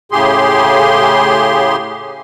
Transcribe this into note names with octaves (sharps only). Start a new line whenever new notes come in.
A2 C#3 G4 G#4 C6